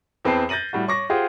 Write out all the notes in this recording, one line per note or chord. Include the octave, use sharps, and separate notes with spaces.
E2 C4 B4 G5 A5 C7
G6 A6 A#6 D#7 F#7
A2 G3 F#4
C#5 C#6 D6 A#6
F4 G4 G#4 C5 F#5